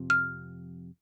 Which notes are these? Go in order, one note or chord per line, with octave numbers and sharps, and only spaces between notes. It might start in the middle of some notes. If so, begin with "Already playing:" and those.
Already playing: F2 C3 F3
F6